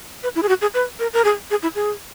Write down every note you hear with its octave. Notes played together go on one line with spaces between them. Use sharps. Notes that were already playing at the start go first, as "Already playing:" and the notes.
B4
E4
G#4
F#4
G#4
B4
A#4
A#4
G#4
G#4
E4
G#4